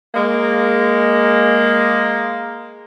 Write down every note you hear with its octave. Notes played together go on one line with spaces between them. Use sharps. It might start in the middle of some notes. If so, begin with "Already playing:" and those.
G#3 A#3